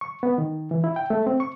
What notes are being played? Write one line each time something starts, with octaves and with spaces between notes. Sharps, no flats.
C#6
B3
D#3
E3
E4
G5
A3
C4
C#6